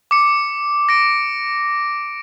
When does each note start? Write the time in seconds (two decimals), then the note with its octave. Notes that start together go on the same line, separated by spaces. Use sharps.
0.11 D6 C#7
0.89 A#6 D7